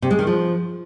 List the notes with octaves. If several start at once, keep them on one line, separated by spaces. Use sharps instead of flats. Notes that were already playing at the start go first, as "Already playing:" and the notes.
C3
G#3
D#3
F3